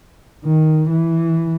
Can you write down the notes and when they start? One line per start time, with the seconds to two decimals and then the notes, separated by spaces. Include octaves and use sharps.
0.45 D#3
0.89 E3